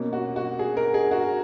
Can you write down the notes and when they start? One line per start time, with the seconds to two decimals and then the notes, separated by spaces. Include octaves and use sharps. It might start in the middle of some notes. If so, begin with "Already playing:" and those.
Already playing: B2 A#3 C#4
0.13 F#4
0.36 F#4
0.59 G#4
0.77 A#4
0.94 G#4
1.11 F#4